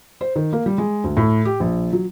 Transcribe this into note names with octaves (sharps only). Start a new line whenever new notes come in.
C5
D#3
A#3
G3
G#3
D2
A2
G4
A#1
F#3